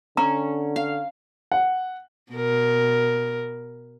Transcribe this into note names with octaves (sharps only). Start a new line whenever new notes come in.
D3 C#4 A#5
F5
F#5
B2 A#4